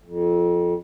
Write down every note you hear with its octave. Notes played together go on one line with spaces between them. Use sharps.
F2